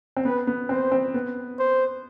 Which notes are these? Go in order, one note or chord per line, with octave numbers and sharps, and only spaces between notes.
C4
B3 B4
B3
C4 C5
C4
B3
C5